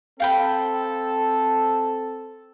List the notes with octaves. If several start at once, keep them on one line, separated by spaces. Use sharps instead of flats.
C4 A4 F5 G5 B5